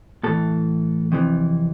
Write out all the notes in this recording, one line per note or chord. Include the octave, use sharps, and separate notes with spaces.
A2 E3 A4
F2 C3 E3